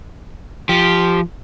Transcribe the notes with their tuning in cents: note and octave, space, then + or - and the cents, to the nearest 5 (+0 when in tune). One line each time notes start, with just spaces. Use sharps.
F3 -10 G4 +0